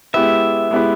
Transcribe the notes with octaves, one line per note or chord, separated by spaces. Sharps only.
G#3 B3 E4 G4 B4 E5
G#3 B3 E4 G4 B4